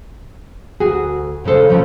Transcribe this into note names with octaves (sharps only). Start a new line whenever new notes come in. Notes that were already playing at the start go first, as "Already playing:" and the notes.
D2 F#4 G#4
A#2 C#3 G#3 A4 C5
B2 F3 F#3 A3 C#4